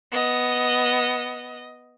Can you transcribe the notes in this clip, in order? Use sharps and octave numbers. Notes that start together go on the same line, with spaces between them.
B3 D#5